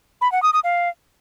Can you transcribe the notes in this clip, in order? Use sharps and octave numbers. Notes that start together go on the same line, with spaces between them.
B5
F#5
D#6
D#6
F5